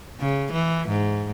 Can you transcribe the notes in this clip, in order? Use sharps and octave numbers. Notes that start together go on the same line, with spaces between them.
C#3
E3
G#2